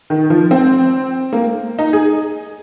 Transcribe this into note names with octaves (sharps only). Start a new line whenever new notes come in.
D#3
F3
C4
A#3
D#4
G#4